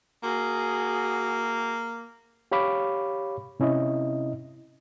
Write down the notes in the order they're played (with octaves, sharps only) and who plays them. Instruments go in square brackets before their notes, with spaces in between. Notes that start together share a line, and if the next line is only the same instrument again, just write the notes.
[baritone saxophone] A#3 [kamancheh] F#4 G#4
[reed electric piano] G4 C#5 F5 B5 D6
C3 C#4 E4 D#5